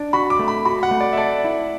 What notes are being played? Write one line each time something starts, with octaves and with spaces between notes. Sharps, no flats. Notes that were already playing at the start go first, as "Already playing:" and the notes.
Already playing: D4
F#4 B5
D6
A3
B5
F#4 B5
F#5
A3
D5
E5
A4 D5
E4